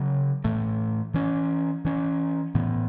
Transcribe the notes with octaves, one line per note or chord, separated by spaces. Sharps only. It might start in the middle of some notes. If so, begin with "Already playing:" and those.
Already playing: C#3 F#3 C#4
A2 E3 A3
E3 C#4
E3 C#4
A2 E3 B3